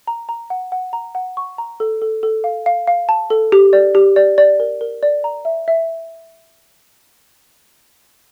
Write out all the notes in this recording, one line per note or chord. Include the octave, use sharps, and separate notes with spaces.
A#5
A#5
F#5
F#5
A#5
F#5
C#6
A#5
A4
A4
A4
F5
F5
F5
A5
A4
G4
D5
G4
D5
D5
A#4
A#4
D5
A#5
E5
E5